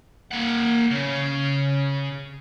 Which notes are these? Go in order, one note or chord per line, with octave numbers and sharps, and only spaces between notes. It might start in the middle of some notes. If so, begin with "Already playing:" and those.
A#3 F#5
C#3